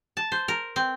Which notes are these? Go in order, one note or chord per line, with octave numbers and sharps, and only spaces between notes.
A5
C5
A#4
C4